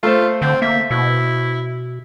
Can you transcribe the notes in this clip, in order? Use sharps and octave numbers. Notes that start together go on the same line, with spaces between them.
A3 F4 A4 C5
D3 C4
A#3 E5
B2 E4